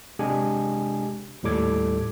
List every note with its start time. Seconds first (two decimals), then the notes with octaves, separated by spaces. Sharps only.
0.19 C3 G#3 D4 G4 G#5
1.43 D#2 A2 G3 A4 D6 G#6